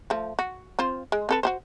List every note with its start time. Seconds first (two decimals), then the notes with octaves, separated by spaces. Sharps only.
0.10 F3 A3
0.39 F#4
0.79 C4 F4 C5
1.12 G#3
1.29 C4 A4 B4
1.43 F#4 G4 C5